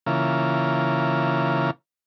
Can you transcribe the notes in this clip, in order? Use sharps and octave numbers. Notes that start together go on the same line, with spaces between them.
C#3 E3 A#3 F4